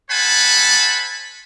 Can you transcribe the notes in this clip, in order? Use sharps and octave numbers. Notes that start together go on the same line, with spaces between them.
A4 C5 F#5 G#5 A5 B5